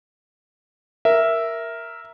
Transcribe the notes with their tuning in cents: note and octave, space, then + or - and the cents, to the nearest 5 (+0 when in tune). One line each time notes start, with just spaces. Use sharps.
A#4 +0 E5 +0